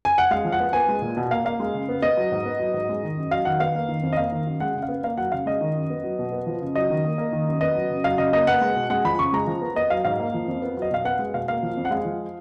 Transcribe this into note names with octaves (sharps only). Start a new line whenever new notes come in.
G#5
F#5
G#3 F5
F3
F#5
B3
B3 G#5
G#3
A#2
B2
A#3 F5
A#3 F5
G#3
C#3
B3
B3 D#5
F#3
G#2
B3
F#3
G#2
G#3
D#3
F#2
F#3 F5
D#3 F#5
B3 F5
A#3
D#3
F2
D#5
A#3 F5
D#3
F#2
G#3 F#5
C#3
F5
B3
A#3 F5
F#3 F#5
C#3 F5
G#3 D#5
D#3
F#2
B3
F#3
B2
B3
F3
C#3
F#3 D#5
D#3
A#3
A#3
D#3
F#2
B3 D#5
F#3
C#3
F#3 F5
C#3 D#5
A#3 D#5
B3 F#5
G#3
B2
G#3 F#5
F3 B5
C#3 C#6
G#3 A#5
F3
B3
B3 D#5
F#3 F5
G#2 F5
A#3
F3
F2
B3
F#3 D#5
B2 F5
B3 F#5
G#3
B2 F5
A#3 F5
F3
F2
F#5
G#3 F5
F3